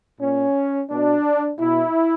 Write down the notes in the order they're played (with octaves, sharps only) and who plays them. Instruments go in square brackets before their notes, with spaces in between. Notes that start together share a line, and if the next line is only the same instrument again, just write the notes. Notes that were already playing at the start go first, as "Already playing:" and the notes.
[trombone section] A#2 C#4
B2 D4
B2 E4